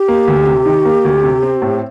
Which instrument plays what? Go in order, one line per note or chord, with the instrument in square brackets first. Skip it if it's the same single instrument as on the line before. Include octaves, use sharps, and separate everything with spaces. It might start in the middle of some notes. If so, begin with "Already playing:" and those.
Already playing: [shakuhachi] G4
[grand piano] A#3
D2
C3
D#3
A#3
D2
C3
C4
A2